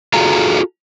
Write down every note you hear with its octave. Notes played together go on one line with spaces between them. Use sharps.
F4 F#4 G#4 A4 F5 A#5